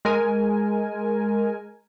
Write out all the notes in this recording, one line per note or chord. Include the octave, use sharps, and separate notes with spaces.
G#3 A#4 G#5